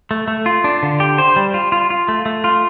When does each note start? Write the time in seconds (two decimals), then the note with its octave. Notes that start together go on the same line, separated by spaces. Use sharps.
0.11 A3
0.28 A3
0.46 F4
0.64 D4
0.83 D3
1.00 G4
1.18 C5
1.36 G3
1.54 F4
1.72 F4
1.90 F4
2.08 A3
2.26 A3
2.44 F4